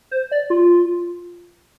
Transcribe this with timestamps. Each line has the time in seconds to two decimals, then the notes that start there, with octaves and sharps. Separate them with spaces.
0.11 C5
0.32 D5
0.50 F4